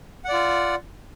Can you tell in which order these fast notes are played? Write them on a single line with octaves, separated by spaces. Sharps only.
F#5 D5 F4